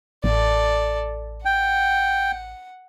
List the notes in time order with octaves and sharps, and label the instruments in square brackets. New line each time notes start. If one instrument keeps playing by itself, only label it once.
[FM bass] A1 [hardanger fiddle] A4 D5
[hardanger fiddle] F#5 [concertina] G5